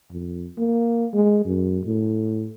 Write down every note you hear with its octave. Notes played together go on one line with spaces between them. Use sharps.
F2
A#3
G#3
F#2
A2